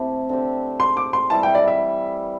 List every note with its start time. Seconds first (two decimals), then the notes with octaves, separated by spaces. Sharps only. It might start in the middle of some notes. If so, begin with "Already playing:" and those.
Already playing: C3 A3 E4 G4
0.29 D3 C4 G4
0.80 C6
0.97 D6
1.13 C6
1.30 E3 G3 E4 A5
1.43 G5
1.55 D5
1.68 E5